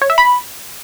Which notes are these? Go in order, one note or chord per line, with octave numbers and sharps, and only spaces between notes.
C#5
E5
B5